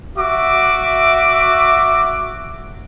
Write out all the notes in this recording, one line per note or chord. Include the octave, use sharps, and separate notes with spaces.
F#4 E5 D6